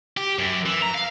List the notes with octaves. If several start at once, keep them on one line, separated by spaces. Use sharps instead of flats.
G4
F#2
E3
A#5
F5